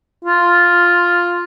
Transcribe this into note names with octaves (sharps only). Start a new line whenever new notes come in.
F4